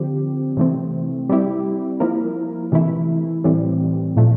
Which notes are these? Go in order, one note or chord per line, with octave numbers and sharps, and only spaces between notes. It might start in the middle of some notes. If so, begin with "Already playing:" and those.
Already playing: D3 F3 C4 G4
C3 E3 A3 C4
G3 C4 E4 G4
F3 A#3 E4 A#4
C3 E3 A3 E4
A2 E3 G3 C4
A#2 F3 A3